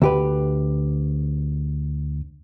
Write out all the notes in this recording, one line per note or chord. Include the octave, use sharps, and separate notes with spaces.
D2 G4 B4